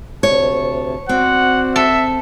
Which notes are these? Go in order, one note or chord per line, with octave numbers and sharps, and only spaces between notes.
D2 C3 C#5 A5
C4 F#4 C5 D5 F#5
A4 E5